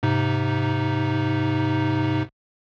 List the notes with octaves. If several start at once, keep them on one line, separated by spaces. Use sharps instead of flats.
G#2 C3 D#4